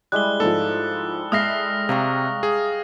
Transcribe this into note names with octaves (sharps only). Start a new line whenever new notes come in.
G3 G#3 E4 F#6 G7
G#2 F3 A4
G#3 E5 D#6 F6 A#6 C7
C3 F5 A#5 C#6
G#4